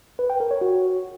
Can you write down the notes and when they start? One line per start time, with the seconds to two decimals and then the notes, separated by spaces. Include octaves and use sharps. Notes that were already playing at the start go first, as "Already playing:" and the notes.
0.19 B4
0.30 G5
0.40 A#4
0.51 C#5
0.61 F#4